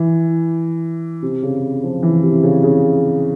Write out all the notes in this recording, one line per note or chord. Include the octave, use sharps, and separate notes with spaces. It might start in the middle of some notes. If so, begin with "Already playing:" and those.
Already playing: E3
C3
C#3
F3
E3
C3
C#3
C#3